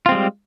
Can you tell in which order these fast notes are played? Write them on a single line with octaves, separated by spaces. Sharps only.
F4 C4 G#3 G3